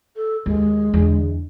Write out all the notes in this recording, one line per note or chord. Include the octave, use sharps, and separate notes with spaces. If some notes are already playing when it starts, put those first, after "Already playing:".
A4
D#2 G#3
E2 D3